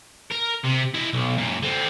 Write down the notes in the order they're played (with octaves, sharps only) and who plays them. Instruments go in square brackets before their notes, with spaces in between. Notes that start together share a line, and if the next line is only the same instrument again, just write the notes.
[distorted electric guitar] A#4
C3
E4 D#5
B1
F#2 A#2
D3 C4